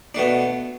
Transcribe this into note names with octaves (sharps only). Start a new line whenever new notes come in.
B2 A3 D4